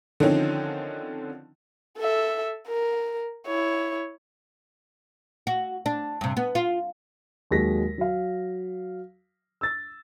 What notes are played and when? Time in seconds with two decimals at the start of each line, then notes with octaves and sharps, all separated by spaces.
0.20 D3 D#3 F3 C4 C#4 D#4
1.98 A4 E5
2.68 A#4
3.47 E4 C#5
5.47 F#4
5.86 D4
6.21 G2 C3
6.37 B3
6.55 F4
7.51 D#2 F#3 G#3 A#6 B6
7.98 F#3 F5
9.61 E6 A6